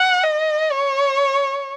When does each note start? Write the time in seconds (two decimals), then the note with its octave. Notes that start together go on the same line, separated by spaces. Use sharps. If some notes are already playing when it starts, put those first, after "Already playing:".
Already playing: F#5
0.23 D#5
0.72 C#5